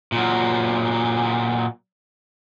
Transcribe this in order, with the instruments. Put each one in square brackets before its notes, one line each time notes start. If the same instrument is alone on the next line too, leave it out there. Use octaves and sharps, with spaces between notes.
[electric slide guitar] A#2 F#3